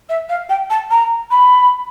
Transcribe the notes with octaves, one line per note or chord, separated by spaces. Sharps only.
E5
F5
G5
A5
A#5
B5